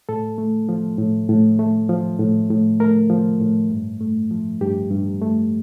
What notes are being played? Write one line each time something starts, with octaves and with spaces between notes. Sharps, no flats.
A2 A4
A3
F3
A2
A2
A3
F3
A2
A2
A3 A#4
F3
A2
G2
A3
F3
G2 G4
G2
A3